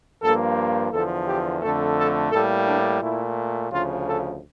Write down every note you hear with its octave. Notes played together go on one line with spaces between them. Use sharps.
G2 F3 A#3 A4
E2 D3 F3 A4
G4
F2 D3 A3 A4
A4
A2 G3 A#3 A4
D4
A#2 A3 E4
D2 C#3 F3 F4
A4